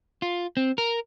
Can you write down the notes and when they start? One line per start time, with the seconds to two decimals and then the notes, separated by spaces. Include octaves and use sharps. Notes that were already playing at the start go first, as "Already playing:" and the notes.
0.22 F4
0.57 C4
0.78 A#4